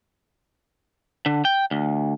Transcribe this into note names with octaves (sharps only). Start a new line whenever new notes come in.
D3
G5
D2